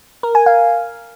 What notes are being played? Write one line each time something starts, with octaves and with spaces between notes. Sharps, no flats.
A#4
G#5
F5